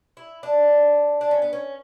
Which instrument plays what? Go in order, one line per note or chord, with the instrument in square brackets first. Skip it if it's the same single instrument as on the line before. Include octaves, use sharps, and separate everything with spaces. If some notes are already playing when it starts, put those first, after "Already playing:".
[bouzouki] E4
D4
D4
C#4
B3
C#4